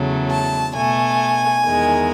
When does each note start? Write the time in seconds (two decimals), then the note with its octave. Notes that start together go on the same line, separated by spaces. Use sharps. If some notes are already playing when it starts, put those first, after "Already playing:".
Already playing: E2 C#3 F#3 A3
0.29 A5
0.74 B2 A3 G#5
1.66 E2 D#3 G#3